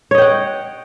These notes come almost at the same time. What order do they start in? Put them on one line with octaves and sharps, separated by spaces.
C#5 D#5 G5 F#5